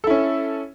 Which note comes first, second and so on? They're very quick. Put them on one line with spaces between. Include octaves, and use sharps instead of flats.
A4 E4 C#4